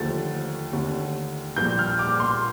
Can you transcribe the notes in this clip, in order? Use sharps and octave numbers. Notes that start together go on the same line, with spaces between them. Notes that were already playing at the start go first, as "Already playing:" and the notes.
Already playing: D#2 D3 F3 A3 A6
D#2 D3 A3
A#1 A#2 G3 G6
F6
D6
C6